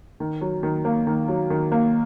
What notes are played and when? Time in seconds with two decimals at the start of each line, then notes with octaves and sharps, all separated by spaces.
0.20 D#3
0.41 F#3
0.63 D#3
0.85 A#3
1.07 D#3
1.28 F#3
1.50 D#3
1.72 A#3